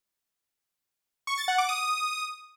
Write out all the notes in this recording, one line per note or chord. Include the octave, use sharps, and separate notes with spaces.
C#6
A6
F#5
D6
D#6